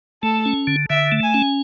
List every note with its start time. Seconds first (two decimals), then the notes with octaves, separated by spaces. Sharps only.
0.23 A3 A4
0.46 C#4
0.67 D3
0.90 D3 E5
1.12 A3
1.23 G#5
1.34 C#4